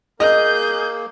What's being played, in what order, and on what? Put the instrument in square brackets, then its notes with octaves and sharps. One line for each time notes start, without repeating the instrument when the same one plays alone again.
[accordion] A#3 [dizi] G#4 [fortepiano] D#5 [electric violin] G6